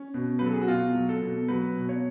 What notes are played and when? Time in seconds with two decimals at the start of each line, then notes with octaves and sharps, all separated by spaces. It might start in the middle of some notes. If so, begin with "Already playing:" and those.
Already playing: C#4
0.14 B2
0.39 F#3 B4
0.46 A4
0.53 G#4
0.61 F#4
0.68 B2 F4
0.95 F#3
1.09 A4
1.22 B2
1.48 F#3 B4
1.77 B2
1.89 C#5